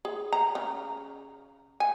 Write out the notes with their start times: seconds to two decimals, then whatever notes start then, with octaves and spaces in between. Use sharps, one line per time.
0.05 G#4
0.33 A#5
0.55 C#3
1.80 G#5